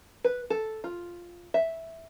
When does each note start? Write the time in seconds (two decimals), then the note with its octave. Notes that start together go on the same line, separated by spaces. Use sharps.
0.24 B4
0.50 A4
0.84 F4
1.54 E5